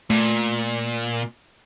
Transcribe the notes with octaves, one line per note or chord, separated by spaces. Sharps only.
A#2 A3